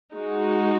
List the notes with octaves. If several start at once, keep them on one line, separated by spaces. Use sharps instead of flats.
G#3 D#4 F#4